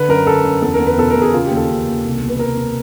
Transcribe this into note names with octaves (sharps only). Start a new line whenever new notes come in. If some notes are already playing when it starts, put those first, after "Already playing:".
Already playing: D3 B4
F#2 A#4
D3 A4
F#2
E2 A4
A#4
E2
B4
B2 A4
A#4
E2
G#4
C#3 F4
G4
D#2
A4
C#3
D#2
C2
B2
B4
C2 A#4
B2